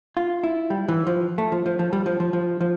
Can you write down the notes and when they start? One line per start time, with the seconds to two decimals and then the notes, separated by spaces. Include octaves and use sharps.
0.17 F4
0.44 E4
0.70 G3
0.88 E3
1.07 F3
1.38 A3
1.52 F3
1.66 F3
1.79 F3
1.93 G3
2.06 F3
2.20 F3
2.33 F3
2.61 F3